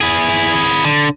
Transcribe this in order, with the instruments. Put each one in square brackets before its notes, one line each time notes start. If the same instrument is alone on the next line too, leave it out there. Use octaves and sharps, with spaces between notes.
[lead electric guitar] E4 G#4
D3